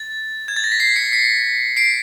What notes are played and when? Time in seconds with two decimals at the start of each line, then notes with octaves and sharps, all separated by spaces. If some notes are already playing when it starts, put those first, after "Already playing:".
Already playing: A6
0.48 G#6
0.56 A6
0.64 A#6
0.72 B6
0.80 C7
0.96 B6 C#7
1.12 B6 C#7
1.77 C7 D7